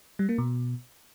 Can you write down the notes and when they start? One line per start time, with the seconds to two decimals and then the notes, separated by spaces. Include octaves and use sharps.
0.19 G3
0.29 A#3
0.38 B2